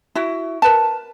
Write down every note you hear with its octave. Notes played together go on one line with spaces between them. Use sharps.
E4 F#4
A#4 B4 A5